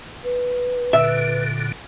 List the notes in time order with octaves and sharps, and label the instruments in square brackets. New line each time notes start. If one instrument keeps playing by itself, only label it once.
[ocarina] B4
[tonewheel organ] A#2 D3 [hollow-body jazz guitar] E5